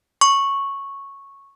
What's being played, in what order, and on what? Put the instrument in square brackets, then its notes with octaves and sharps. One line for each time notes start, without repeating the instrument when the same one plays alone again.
[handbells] C#6